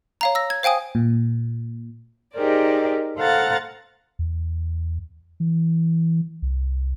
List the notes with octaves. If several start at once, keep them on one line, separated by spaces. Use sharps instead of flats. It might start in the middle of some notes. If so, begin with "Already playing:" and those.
C#5 F5 A#5
E6 A#6
G#6
C5 F5 G5 G#5 D#6
A#2
D#4 G4 G#4 A#4 C5 D5
A4 C5 F5 F#5 A#5 A6
E2
E3
C2